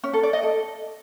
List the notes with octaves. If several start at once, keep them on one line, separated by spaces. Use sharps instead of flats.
C#4
A4
D5
D#5
A4